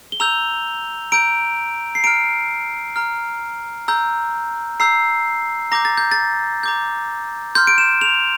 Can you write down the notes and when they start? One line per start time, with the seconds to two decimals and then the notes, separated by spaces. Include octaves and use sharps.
0.12 G7
0.20 A#5 E6 G6 F7
1.12 A#5 E6 G6 D7
1.95 C7
2.04 A#5 F6 D7
2.96 A#5 F6
3.88 A#5 E6 G6
4.80 A#5 E6 G6 C7
5.72 A#5 D6 G6 A#6
5.85 A6
5.97 G6
6.12 A6
6.63 A#5 D6 G6
7.55 C6 F6 G6
7.67 D7
7.78 E7
8.01 F7